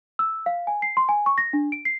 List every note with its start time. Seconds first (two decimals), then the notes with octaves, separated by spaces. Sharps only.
0.19 E6
0.46 F5
0.67 G#5
0.82 C7
0.97 C6
1.09 G#5
1.26 C#6
1.38 A#6
1.53 D4
1.72 D7
1.85 C7